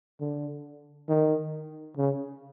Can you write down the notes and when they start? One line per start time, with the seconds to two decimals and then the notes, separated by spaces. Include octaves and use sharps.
0.20 D3
1.09 D#3
1.97 C#3